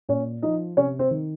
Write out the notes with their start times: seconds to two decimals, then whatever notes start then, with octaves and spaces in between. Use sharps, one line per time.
0.09 A#2 C#4 C#5
0.42 F3 D#4 D#5
0.77 C3 C#4 C#5
0.99 C4 C5
1.11 D#3